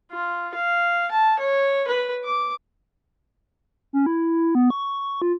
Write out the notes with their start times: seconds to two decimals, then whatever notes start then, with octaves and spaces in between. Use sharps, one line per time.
0.12 F4
0.55 F5
1.12 A5
1.40 C#5
1.88 B4
2.24 D6
3.93 C#4
4.06 E4
4.55 B3
4.70 C#6
5.22 F4